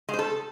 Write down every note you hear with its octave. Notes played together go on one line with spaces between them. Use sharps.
G#3
C5
A4